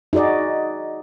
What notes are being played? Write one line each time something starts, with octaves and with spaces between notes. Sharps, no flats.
D#4 F#4 G#4 D5 D#5